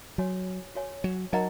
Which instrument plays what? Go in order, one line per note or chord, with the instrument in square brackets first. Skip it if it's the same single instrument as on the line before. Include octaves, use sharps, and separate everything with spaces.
[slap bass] F#3 [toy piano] F#4 C#5 G#5
[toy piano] F#4 C#5 G#5
[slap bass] F#3
[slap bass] F#3 [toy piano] D#4 A#4 D#5 F#5 A#5